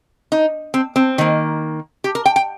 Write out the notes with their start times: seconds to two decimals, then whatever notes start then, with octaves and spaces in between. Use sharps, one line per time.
0.32 D#4
0.74 C4
0.96 C4
1.18 D#3 A#3
2.04 G4
2.15 A#4
2.26 G5
2.36 G5